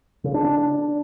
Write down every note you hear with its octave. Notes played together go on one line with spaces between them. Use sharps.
C#3
D4
D4